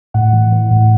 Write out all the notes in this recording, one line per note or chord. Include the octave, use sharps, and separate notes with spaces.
A2 F#5
E3
E3
A2